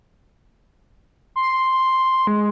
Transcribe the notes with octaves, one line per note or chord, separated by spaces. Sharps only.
C6
G#3